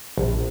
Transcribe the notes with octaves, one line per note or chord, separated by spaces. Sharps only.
A#1